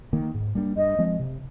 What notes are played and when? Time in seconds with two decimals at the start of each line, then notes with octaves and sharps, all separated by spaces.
0.13 D#3 A#3
0.34 G#2
0.55 G3 A#3 D4
0.76 G2 D#5
0.99 F3 G#3 C4
1.19 C3